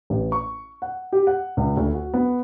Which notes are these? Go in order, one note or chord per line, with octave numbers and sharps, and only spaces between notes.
A1
C#6
F#5
G4
F#5
C#2
D2
F#4
B3